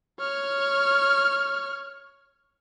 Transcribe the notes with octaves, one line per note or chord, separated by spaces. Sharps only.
C#5 F6